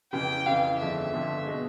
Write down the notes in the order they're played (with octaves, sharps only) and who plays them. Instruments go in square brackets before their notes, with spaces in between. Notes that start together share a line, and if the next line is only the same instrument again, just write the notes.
[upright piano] F2 C#3 E3 [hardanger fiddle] G5
[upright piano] F2 C#3 E3 [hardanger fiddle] F5
[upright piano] G1 F2 D3 F3 G#3 [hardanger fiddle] E5
[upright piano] G1 F2 D3 F3 G#3
B2 G#3